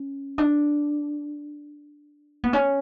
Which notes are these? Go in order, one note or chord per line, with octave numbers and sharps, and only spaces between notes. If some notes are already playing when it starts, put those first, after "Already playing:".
Already playing: C#4
D4
B3
C#4